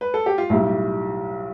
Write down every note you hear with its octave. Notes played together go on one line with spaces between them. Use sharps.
B4
A4
G4
F4
B1 A2 G3 E4